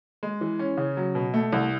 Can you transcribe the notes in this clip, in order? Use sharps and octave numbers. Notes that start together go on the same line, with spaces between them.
G#3
E3
C#4
C#3
F#3
B2
A3
C2